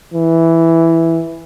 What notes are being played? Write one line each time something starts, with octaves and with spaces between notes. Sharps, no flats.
E3